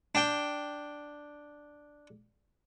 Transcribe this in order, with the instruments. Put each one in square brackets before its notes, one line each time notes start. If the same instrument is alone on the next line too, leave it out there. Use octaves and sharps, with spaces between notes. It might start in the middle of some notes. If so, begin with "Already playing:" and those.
[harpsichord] D4 G5